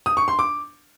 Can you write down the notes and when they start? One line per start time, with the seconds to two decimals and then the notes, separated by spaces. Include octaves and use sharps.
0.06 D#6
0.17 C#6
0.28 C6
0.39 D6